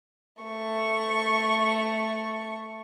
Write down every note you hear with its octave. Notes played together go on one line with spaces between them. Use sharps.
A3 C#6